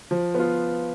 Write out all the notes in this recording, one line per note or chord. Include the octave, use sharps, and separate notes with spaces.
F3
B3 F4